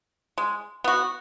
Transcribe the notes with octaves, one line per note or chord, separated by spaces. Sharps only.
G#3
B3 F#4